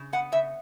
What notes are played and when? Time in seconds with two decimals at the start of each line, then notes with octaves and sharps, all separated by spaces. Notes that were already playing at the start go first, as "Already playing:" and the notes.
Already playing: C#3
0.13 B3 F#5
0.32 C#3 E5